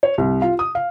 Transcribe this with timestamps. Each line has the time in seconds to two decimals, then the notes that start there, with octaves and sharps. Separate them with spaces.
0.03 C#5
0.18 C2
0.42 F4
0.59 D#6
0.75 F5